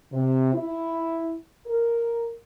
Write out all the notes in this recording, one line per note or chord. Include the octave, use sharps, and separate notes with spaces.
C3
E4
A#4